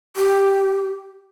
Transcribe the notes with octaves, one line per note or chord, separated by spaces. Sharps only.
G4